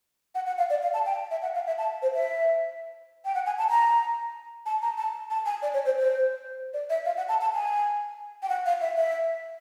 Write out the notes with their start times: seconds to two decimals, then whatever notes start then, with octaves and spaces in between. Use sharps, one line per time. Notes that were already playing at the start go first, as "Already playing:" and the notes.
0.35 F#5
0.46 F#5
0.58 F5
0.70 D5
0.82 F5
0.94 A5
1.06 G5
1.31 E5
1.42 F#5
1.55 F5
1.67 E5
1.78 A5
2.02 C5
2.14 E5
3.25 G5
3.34 F#5
3.46 G#5
3.58 A5
3.70 A#5
4.66 A5
4.82 A#5
4.97 A5
5.30 A5
5.46 G#5
5.62 D5
5.74 C#5
5.85 C5
5.98 C5
6.73 D5
6.90 E5
7.05 F5
7.17 F#5
7.29 A5
7.41 A5
7.54 G#5
8.42 G5
8.49 F#5
8.66 F5
8.81 E5
8.97 E5